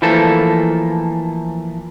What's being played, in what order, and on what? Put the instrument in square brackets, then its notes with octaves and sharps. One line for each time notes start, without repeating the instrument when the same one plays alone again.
[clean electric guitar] E3 F3 A3 A#3 A4